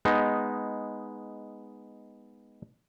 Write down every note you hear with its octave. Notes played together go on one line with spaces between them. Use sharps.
G#3 B3 D#4